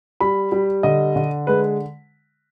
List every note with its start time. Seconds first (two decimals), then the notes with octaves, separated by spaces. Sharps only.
0.20 G3 B5
0.52 G3
0.83 D3 D#5
1.16 D3
1.47 G#3 B4